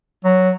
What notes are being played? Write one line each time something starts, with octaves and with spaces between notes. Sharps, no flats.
F#3